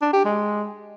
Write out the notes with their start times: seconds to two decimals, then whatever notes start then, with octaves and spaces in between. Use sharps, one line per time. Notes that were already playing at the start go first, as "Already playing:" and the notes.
0.01 D4
0.13 G4
0.25 G#3